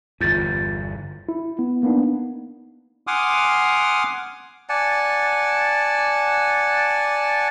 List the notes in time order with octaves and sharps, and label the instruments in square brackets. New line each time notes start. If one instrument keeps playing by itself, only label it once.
[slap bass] G1 E2 [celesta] F4 G6 A6
[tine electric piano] E4
B3
A#3 B3 D4 D#4
[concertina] F#5 G#5 C6 D6 D#6 F6
[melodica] D5 F#5 G#5 A5